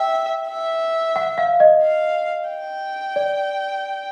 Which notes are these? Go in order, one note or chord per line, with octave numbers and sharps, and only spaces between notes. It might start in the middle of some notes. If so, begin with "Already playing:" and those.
Already playing: E5 G5
E5
F#5
F5
D#5
F5
G5
D5